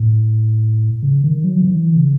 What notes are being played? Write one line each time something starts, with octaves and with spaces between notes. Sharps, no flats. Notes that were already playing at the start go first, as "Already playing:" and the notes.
Already playing: A2
C#3
D#3
F#3
D#3
E3
C#3